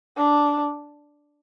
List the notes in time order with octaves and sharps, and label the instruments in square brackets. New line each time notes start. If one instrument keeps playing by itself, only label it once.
[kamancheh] D4